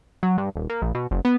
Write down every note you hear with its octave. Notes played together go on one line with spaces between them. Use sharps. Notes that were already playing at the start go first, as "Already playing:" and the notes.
F#3
G2
D#1
A#3
A#1
B2
F#1
B3